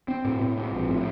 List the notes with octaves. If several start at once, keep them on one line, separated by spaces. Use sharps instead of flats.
C4
A2
A2
C4
A#1
A2